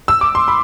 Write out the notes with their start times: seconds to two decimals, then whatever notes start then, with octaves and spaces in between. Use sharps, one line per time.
0.08 E6
0.21 D6
0.35 C6
0.48 B5